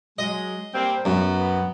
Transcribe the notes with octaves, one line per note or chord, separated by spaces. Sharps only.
F#3 G#3 D#5
G3 A#3 C4
F#2 B3
B3